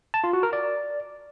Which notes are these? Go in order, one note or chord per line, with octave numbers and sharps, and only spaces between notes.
A5
F4
F#4
A#4
D5